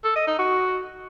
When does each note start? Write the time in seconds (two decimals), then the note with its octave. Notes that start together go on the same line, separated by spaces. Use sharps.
0.04 A4
0.16 D#5
0.27 D#4
0.39 F#4